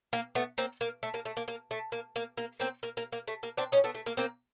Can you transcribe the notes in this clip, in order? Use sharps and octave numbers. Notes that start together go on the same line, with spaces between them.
A#3
A3 B3
A#3 C4
A#3
A3
A#3
A3
A#3
A#3
A3
A#3
A#3
A#3
A#3 C4
A#3
A#3
A#3
A3
A#3
C4 D4
C#4 D#4
A3 B3
A3
A#3
A#3 C4